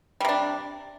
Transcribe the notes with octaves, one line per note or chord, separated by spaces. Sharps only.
C3 G3 D4